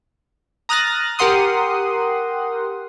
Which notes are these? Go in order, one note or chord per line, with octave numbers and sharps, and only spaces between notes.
A#5 D#6 F6 F#6 A6 A#6
G4 A#4 F#5 C6 D#6